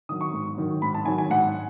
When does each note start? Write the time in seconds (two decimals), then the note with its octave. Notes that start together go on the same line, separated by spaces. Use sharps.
0.09 D#3 D#6
0.12 F#3
0.21 C#6
0.34 G#2
0.58 D#3 F#3
0.82 G#2 B5
0.95 A5
1.05 D#3 F#3 G#5
1.18 G#5
1.30 G#2 F#5